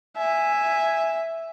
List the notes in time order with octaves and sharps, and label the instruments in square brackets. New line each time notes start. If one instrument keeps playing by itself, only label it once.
[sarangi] E5 [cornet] G#5